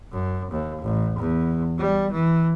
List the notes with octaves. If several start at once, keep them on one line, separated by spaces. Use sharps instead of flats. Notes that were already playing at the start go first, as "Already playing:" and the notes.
F#2
D#2
A1
E2
G3
E3